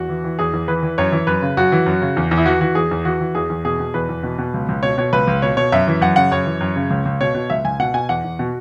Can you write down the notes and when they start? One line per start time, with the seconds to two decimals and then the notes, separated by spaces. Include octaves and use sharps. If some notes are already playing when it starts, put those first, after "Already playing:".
Already playing: E2 F#4
0.09 E3
0.24 E3
0.39 E2 G#4
0.53 E2
0.68 E3 B4
0.83 E3
0.98 F#2 C#5
1.12 E3
1.27 F#2 B4
1.42 C#3
1.57 F#2 F#4
1.72 E3
1.86 F#2
2.02 C#3
2.17 E2
2.31 E2
2.38 E4
2.46 E3 F#4
2.61 E3 F#4
2.75 E2 G#4
2.91 E2
3.05 E3 F#4
3.21 E3
3.35 E2 G#4
3.50 E2
3.65 B2 G#4
3.79 B2
3.94 E2 B4
4.09 E2
4.23 B2
4.38 B2
4.54 C#2
4.69 C#2
4.83 B2 C#5
4.98 B2 C#5
5.13 C#2 B4
5.27 C#2
5.42 B2 C#5
5.57 B2 C#5
5.72 F#2 E5
5.87 E3
6.01 F#2 F#5
6.16 C#3 F#5
6.31 F#2 C#5
6.46 E3
6.61 F#2
6.76 C#3
6.90 C#2
7.05 C#2
7.20 B2 C#5
7.35 B2
7.50 C#2 E5
7.65 C#2 G#5
7.79 B2 F#5
7.94 B2 G#5
8.09 E2 F#5
8.24 E2
8.39 B2 F#4